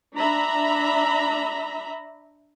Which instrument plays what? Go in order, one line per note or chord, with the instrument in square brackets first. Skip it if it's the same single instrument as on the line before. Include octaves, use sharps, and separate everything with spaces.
[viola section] D4 E5 A#5 B5